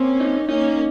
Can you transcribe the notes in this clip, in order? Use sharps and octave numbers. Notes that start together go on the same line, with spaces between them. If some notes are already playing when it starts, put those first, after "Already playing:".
Already playing: A#3 C4 C#4
D#4
A#3 C#4 D#4